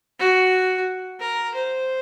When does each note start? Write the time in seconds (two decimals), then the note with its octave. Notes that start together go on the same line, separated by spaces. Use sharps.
0.19 F#4
1.20 A#4
1.54 C5